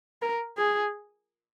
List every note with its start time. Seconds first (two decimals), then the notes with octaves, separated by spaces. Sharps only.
0.22 A#4
0.58 G#4